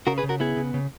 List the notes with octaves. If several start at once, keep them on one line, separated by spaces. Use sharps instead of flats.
C#3 F#4 A#4
G#4 B4
C#3
F#4 A#4
B3 E4 G#4
C#3
C#3